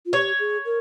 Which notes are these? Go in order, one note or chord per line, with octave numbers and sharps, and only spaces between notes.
F4
G4 C#5
G#4
A#4